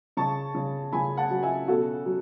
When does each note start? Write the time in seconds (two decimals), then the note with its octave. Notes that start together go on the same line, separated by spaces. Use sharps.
0.17 C#3 A5 C#6
0.54 C#3
0.93 C#3 G#5 B5
1.17 F#5 A5
1.30 F#3
1.43 E5 G#5
1.68 B2 F#4 A4
2.06 F#3